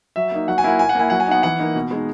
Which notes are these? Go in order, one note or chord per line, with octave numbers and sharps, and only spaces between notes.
F#3 E5
A#3 D#4
F#3 F#5
G#5
A#3 E4 F#5
A#2 G#5
F#5
A#3 E4 G#5
F#3 F#5
G#5
B3 D#4 F#5
E3 F#5
A#3 D#4
B2
G#3 D#4